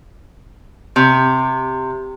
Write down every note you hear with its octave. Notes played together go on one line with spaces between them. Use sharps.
C3